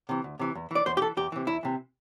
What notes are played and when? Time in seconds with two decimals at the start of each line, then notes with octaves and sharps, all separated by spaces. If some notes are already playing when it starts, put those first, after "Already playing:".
0.09 C3 E3
0.24 D2
0.39 C3 E3
0.55 E2
0.71 E3 D5
0.86 E2 C5
0.97 G4
1.01 E3 A4
1.17 E2 G4
1.32 C3 E3
1.47 E2 E4
1.63 C3 E3